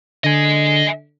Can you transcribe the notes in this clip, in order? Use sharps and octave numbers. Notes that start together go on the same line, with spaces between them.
D3 D#5 G#5